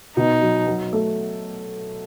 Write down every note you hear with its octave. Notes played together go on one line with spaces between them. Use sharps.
B2 D#4
F#3
F#3
A3